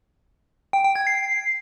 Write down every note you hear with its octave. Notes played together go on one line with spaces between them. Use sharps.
G5
G5
G#6
C7